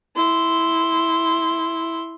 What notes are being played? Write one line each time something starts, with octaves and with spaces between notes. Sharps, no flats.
E4 C6